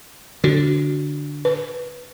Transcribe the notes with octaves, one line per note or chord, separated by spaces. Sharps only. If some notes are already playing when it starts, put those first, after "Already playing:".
D3 F#4
B4